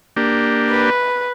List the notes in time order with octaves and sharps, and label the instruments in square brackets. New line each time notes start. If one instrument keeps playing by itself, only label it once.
[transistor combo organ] A#3 D4 G4
[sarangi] B4